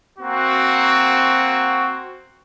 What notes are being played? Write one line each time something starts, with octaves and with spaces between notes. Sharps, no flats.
A#3 C4 F#4